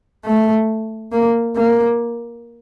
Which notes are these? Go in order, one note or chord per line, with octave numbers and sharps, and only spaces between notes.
A3
A#3
A#3